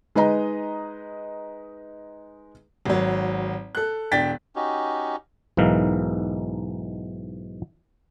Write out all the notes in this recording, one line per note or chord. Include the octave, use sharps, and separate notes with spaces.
G#3 D#4 B4 D#5 A#5
G#1 F#3
A4 F#6
E1 D4 G5 A6 B6
C#4 D#4 F#4 G4
B1 G#2 E3 D#4 A#4 F5